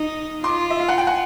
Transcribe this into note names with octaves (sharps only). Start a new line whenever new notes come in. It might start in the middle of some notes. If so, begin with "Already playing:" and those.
Already playing: D#4
F4 C6 D6
E5
F5
F#5
G5
F#5 G#5